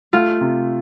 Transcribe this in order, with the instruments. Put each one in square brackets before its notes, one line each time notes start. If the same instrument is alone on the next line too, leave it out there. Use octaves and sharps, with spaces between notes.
[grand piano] A3 [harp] F4
[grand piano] C3